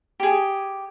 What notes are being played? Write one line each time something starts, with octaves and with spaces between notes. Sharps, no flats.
G4 G#4